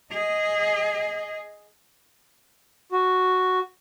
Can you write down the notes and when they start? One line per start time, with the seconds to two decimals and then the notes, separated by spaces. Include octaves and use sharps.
0.12 G#4 D#5
2.92 F#4